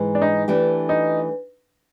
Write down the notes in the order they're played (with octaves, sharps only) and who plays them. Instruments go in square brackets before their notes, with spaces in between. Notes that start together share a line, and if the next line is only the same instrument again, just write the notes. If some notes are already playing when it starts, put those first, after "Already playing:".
Already playing: [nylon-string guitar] G#2 E3 G#3
[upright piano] D4
D#4
[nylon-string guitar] E3 A3 D4 G4
[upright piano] D#4